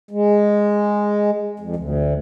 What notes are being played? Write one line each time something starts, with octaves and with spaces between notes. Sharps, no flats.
G#3
F2
D2